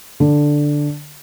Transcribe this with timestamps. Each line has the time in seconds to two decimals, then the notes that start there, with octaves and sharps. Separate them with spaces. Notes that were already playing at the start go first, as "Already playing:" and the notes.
0.20 D3